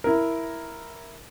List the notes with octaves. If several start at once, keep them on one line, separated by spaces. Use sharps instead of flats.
E4 A#4